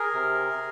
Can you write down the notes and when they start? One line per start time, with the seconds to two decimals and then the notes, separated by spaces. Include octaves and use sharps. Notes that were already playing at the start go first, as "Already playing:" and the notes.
Already playing: G#4 A#4
0.13 C3